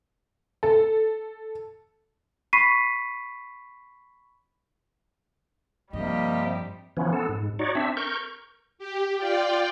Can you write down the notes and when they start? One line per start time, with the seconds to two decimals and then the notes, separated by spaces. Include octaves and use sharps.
0.63 A4
2.53 B5 C#6 B6 C7 D#7
5.93 G2 C3 F3 G3 A#3 G4 D#5
6.97 E3 F3 B3 C#4
7.13 B3 A4
7.29 G#2
7.59 D#4 F#4 C#5 D5
7.75 C4 D4 E5
7.97 A#4 C#6 G6
8.79 G4
9.18 F4 D5 G5